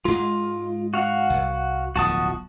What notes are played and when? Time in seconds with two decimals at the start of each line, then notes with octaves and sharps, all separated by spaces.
0.05 G#2 G#3 F4
0.94 F#4 F5 F#5
1.30 C2
1.96 D1 B1 F3 F#4 A5 D#6